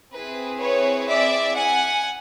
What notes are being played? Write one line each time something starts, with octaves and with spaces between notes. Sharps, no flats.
C4 E4 G#4 B4
B4 C#5
D5 E5
F#5 G#5